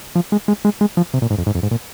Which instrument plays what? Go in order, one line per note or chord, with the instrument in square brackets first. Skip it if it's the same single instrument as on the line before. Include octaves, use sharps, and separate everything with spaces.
[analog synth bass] F3
G#3
G#3
G#3
G#3
F3
C3
A#2
G#2
F2
G#2
F2
G#2
A#2